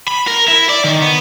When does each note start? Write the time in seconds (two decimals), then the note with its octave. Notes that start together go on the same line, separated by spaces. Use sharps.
0.08 B5
0.27 A#4
0.48 E4
0.69 D5
0.84 D#3
1.02 B3